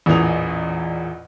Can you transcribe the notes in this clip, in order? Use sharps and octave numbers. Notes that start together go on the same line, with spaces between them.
A1 E2 A#2 G#4 D#6 F7